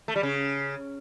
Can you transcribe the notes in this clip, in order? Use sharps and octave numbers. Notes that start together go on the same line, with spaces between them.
A3
G3
C#3